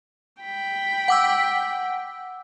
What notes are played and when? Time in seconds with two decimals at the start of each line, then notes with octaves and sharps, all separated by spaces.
0.41 G5 B5
1.08 F#5 D6 E6